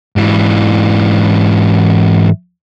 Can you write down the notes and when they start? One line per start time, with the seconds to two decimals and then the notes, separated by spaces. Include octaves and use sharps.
0.17 G#2 E3